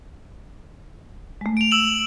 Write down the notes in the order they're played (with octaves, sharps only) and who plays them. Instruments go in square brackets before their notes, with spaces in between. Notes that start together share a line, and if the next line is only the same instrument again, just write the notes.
[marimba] G#3 A3
[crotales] D7 F7
E6 E7 F#7